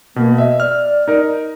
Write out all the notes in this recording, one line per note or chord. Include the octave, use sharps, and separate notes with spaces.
B2 A#3
D#5 E5
D5 F6
D#4 A#4